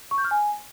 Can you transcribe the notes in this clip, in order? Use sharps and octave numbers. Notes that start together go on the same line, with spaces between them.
C#6
G6
F6
G#5